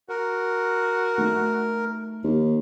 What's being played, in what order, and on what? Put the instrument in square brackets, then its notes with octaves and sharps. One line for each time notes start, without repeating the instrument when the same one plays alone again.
[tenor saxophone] F#4 [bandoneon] A#4
[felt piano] A3 D#4
[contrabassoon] D#2